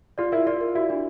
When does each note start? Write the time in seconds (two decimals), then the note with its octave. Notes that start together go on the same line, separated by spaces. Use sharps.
0.18 F4 D5
0.32 E4 A#4
0.46 F4 D5
0.61 A#4
0.75 E4 F#4
0.89 D4 E4